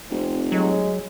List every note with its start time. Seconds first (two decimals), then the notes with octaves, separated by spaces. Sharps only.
0.11 F1 C4
0.52 F#3 G#3